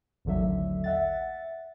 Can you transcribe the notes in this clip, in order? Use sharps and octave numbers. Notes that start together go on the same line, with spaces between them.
A1 D#2 D3 F#3 E5
E5 F#5 A6